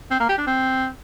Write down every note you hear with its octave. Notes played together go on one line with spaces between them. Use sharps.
C4
A#3
G4
D4
C4